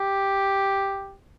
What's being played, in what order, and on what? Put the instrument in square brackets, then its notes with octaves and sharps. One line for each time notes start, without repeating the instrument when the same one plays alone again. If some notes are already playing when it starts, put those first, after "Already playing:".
Already playing: [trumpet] G4